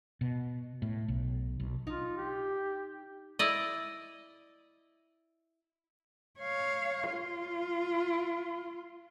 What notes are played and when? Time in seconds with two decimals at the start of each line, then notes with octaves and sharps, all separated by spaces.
0.21 B2
0.82 A2
1.08 B1
1.60 B1
1.87 D#4 F4
2.17 G4
3.39 E4 D5 D#5
6.39 C#5 F5
7.11 F4